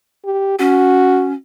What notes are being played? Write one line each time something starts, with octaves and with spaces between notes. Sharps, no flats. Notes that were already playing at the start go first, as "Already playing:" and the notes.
G4
C#4 F#4